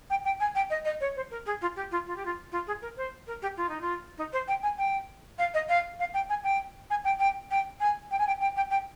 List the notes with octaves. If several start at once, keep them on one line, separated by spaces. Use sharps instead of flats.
G5
G5
G#5
G5
D#5
D#5
C#5
C5
A#4
G#4
F4
G4
F4
F4
G4
F4
F4
G#4
A#4
C5
A#4
G4
F4
D#4
F4
D#4
C5
G5
G#5
G5
F5
D#5
F5
F5
G5
G#5
G5
G#5
G5
G5
G5
G#5
G5
G#5
G5
G5
G5
G5